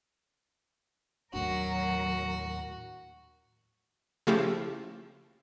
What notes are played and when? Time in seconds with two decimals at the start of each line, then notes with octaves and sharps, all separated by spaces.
1.33 D#2 A2 F#3 D4 F#4 A#4
4.27 C#3 F3 A3 E4 F4 G4